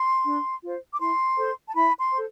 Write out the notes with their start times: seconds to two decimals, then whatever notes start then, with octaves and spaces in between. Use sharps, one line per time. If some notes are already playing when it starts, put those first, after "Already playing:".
Already playing: C6
0.25 D4
0.62 F4 C5
0.93 D6
1.00 E4 C6
1.37 A4 C5
1.67 A5
1.74 E4 B5
1.99 C6
2.12 A4 C5